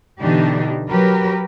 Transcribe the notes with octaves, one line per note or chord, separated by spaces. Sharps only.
B2 D3 E3 D4 D#4 G4
F#3 G4 A#4 B4